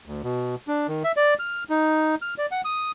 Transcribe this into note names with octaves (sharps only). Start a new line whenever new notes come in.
D2
B2
D4
D#3
E5
D5
F6
D#4
F6
D5
F#5
D#6